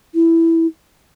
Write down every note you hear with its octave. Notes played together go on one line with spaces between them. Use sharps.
E4